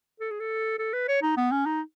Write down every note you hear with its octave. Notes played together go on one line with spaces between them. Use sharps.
A4
G#4
A4
A4
B4
C#5
D#4
B3
C#4
D#4